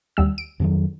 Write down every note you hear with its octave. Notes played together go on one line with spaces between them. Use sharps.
D#2 G3 E6
D7
F2 D#3 F#3